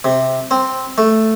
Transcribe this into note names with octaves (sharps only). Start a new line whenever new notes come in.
C3
C4
A3